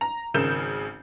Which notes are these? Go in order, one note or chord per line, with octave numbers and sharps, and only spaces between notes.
A#5
G#1 C#3 A#4 G6 E7